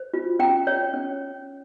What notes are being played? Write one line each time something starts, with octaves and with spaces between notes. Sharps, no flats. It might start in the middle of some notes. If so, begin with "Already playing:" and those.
Already playing: C5
F4
C#4 G5 A#5
C#5
C#4